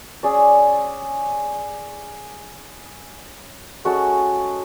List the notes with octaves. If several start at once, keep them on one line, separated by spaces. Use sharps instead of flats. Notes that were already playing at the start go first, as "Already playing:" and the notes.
C#4 G#4 D5
G#3 C#4 F#4 A4